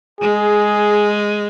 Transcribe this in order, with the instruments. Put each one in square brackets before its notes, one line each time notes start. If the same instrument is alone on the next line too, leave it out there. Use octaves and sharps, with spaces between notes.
[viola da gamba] G#3 [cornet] G#4